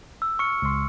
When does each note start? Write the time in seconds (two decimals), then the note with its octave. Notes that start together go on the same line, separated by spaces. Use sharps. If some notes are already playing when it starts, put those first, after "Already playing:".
0.22 E6
0.39 C#6 F6 C#7
0.62 C#2 C6